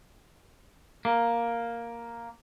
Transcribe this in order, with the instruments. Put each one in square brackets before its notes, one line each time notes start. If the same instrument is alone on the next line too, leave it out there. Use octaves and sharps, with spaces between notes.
[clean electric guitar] A#3